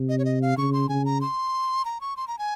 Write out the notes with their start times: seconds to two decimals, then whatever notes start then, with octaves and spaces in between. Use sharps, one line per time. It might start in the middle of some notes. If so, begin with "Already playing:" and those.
Already playing: C3
0.09 D#5
0.18 C#5
0.25 D#5
0.42 F5
0.58 C#3 C#6
0.73 C6
0.89 C#3 G#5
1.05 A#5
1.21 C6
1.85 A#5
2.01 C#6
2.17 C6
2.28 A#5
2.38 G#5